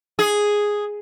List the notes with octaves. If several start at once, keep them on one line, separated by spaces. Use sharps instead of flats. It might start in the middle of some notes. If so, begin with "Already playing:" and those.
G#4